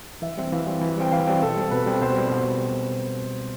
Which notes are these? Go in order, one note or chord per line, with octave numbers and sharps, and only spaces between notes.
E3 E5
G3 C4
E3 F5
G3 C4
E3
G3 C4 G5
E3 F5
G3 C4
B2 A4
G3 C4
B2 B4
G3 C4
B2 C5
G3 C4
B2